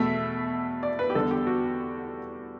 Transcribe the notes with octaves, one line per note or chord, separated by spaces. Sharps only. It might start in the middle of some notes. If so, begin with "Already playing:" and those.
Already playing: E2 B2 A3 E5
D5
B4
G4
E2 D3 G3 A4
G4
F#4